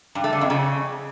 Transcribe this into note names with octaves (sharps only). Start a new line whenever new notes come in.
G2
A3
D3
F2
C#3